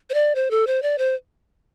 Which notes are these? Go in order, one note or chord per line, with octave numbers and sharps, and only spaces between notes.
C5
D5
C5
A4
C5
D5
C5